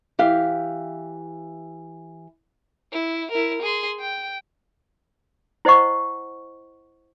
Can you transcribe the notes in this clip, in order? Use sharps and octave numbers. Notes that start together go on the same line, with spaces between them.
E3 G4 F5
E4
E4 A#4
G#4 C6
G5
E4 C5 D#5 F#5 C#6